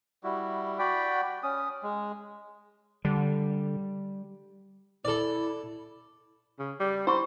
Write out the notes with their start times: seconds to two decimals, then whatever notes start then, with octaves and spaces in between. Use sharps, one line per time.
0.23 G3 E4 F#4
0.79 F#4 D5 G5 B5
1.43 C#4 D#6
1.83 G#3
3.05 D3 G3
5.05 E4 A4 D5
6.59 C#3
6.80 G3
7.07 E4 C5 B5 C#6